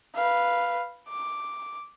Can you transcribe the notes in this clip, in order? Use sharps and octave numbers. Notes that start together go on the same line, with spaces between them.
B4 F5
D6